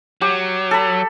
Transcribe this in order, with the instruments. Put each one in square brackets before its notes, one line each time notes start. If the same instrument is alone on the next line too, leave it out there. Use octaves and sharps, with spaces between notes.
[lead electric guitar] F#3 [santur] G4
[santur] A4 B5